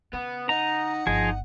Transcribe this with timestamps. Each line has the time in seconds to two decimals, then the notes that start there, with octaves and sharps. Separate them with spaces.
0.13 C#3 B3
0.49 D#4 F#5 A#5
1.07 G1 F3 D#4 G#4